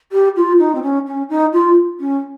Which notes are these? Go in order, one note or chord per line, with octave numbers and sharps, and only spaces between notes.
G4
F4
D#4
C4
C#4
C#4
D#4
F4
C#4